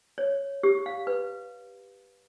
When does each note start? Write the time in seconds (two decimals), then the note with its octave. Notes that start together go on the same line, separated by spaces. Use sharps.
0.18 C#5
0.63 G4
0.86 F5
1.07 B4